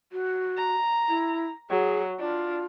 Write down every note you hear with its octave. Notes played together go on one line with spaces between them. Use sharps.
F#4
A#5
E4
F#3 G#4
D4 F4